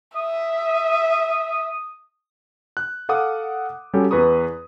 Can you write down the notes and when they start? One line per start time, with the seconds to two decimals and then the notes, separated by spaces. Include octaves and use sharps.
0.16 E5 D#6
2.77 F#6
3.09 A4 F5 F#5 D6 D#6
3.93 F#3 G3 C#4 G4 A4
4.11 E2 B4 A#5 C#6 D#6